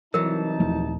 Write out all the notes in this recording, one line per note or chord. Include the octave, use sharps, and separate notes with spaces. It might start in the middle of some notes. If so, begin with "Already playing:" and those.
C2 E3 F#3 D#4 A#4 A5
D#1 F3 A3